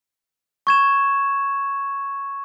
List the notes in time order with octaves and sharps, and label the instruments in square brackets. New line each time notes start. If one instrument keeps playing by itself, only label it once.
[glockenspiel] C#6 G#6 E7